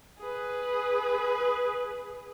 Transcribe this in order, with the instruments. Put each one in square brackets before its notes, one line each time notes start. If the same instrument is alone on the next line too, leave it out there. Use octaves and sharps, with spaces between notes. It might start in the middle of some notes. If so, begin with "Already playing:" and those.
[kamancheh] G#4 B4